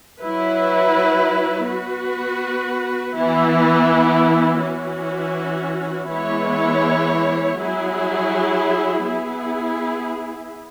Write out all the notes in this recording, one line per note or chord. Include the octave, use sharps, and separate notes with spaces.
F#3 E4 B4
B3 F#4 B4
E3 B3 E4
E3 C#4 F#4
E3 G#3 B3 E4 C#5
F#3 E4 G#4
B3 E4 G#4